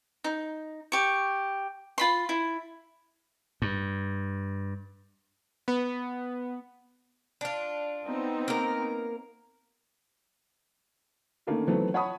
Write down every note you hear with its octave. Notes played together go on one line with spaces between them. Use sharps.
D#4
G4 C#6
F4 B5 C6
E4
G2
B3
D4 F4
B3 C4 D#4
A#3 A#4
D3 D#3 A3 A#3 C#4
D#3 E3 F#3 A3 B3 C4
C#5 F#5 A5 B5 C#6 D#6